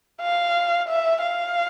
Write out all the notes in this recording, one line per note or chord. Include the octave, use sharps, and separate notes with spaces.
F5
E5
F5